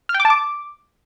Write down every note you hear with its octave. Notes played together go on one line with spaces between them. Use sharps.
F6
G5
D6
A5
D6